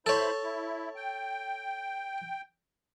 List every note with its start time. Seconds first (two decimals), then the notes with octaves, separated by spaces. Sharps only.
0.06 E4 A4 C5 C#5 B5
0.43 E4
0.96 G5